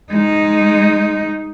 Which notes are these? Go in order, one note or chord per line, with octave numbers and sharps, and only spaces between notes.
G#3 D#4